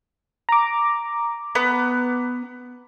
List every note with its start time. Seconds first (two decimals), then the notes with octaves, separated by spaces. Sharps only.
0.49 A#5 D6
1.55 B3